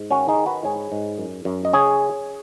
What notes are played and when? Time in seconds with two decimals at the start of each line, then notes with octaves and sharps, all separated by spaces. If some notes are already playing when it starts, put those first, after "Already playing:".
Already playing: G#2
0.11 D#3 C#4 F#4
0.28 D#4 G#4
0.38 D#3
0.46 F#4 B4
0.64 G#2 G#4 C#5
0.92 G#2
1.18 F#2
1.45 F#2
1.65 D#5
1.73 C#3 G#4 C#5